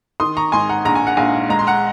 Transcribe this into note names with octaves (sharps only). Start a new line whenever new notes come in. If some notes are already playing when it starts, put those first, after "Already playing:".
D#3 C6 D#6
A#5 C#6
G#2 G#5 C6
F#5 A#5
A#1 A#5
G#5
F#5
A#1 F5 G#5
G#3 A#5
C6
F#5 A#5